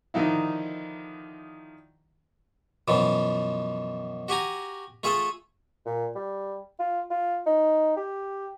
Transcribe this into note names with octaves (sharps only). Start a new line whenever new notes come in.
D3 D#3 F3 D#4 E4
F#2 B2 E3 F3
F#4 G4 G#5 A#5
A3 F4 G#4 A4
A#2
G3
F4
F4
D#4
G4